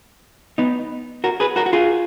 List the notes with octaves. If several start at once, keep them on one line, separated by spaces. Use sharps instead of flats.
B3 D#4
F#4 A#4
G#4 B4
F#4 A#4
F#4
F4 G#4